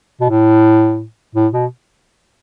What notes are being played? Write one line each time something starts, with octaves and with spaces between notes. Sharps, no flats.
B2
A2
A2
B2